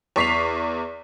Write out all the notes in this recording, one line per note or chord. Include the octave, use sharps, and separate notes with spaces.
E2 C#6 B6 C7 F7